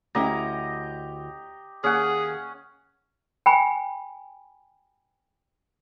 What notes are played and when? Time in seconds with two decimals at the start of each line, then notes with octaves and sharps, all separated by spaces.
0.15 D2 C#4 E4 G4 D#5 A#5
1.84 D#2 C#4 G#4 F#5
3.46 G5 G#5 B5